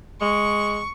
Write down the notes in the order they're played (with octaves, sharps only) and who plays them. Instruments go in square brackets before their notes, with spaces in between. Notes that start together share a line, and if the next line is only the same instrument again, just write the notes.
[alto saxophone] G#3 [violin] C#6